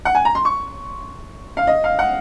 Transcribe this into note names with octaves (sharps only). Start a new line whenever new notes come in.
F#5
G#5
A#5
C6
C#6
F5
D#5
F5
F#5